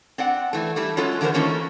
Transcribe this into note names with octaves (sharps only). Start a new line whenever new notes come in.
C4 D5 F#5
E3 A3
E3 G3 A3 E4
F#3 G#3 C#4 F4 A4
D3 E3 F#4 G#4 A#4 C5
D#3 E3 A3 A#3 C#4 F4